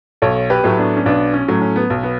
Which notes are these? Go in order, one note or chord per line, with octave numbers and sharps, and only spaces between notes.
B1 A4 C#5
G4 B4
A2 F#3 A3
B3 D4
C#4
B1 B3 D4
C#4
A2 F#3 A3
C#4
B3
B1
B3